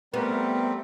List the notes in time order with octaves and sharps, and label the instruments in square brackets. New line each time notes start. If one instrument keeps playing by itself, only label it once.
[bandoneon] G3 C4 [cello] A3 [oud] B3 [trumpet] A#4